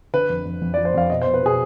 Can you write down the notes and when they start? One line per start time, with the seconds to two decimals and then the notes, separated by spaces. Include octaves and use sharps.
0.13 D3 B4
0.30 F2
0.45 F2
0.62 F2
0.74 D5
0.77 F3
0.85 C5
0.94 F2 F5
1.10 B2 D#5
1.22 C5
1.26 B2
1.34 B4
1.42 B2 G#4